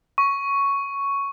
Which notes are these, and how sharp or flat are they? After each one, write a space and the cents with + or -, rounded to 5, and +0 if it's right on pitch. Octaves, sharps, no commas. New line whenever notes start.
C#6 +5